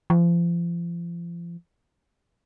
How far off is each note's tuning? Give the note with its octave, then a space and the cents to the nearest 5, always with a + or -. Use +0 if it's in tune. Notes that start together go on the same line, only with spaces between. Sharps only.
F3 -35